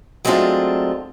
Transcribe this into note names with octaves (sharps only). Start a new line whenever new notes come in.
F#3 G#3 A3 C4 D4 F4